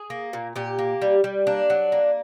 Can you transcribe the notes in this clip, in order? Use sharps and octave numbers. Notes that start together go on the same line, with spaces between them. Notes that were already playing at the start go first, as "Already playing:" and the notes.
Already playing: G#4
A#3
A#2
A#2 G4
A#3
G3
G3
A#3 D4
F#3
A#3